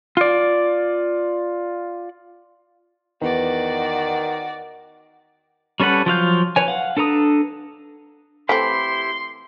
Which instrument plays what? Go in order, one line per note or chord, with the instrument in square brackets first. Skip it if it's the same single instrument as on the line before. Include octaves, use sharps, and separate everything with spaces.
[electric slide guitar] F4 D5
[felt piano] E2 [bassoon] D#3 [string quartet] F#4 D5
[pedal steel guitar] G3 C#4 A4 B4 F#5
F3 F#3 F5 G6
B4 C#5 G#5
F5 F#5
D4 A4 B4 A#5 D#6
[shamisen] E3 A3 C4 [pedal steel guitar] E4 G4 B5 [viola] C6